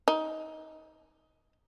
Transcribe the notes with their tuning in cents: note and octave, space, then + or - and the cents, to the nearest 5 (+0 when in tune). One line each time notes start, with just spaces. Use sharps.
D#4 +20